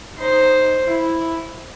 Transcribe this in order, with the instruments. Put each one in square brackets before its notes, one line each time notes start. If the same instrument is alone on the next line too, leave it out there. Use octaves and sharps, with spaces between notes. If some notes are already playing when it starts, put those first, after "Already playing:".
[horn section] D#4 [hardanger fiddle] C5
[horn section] E4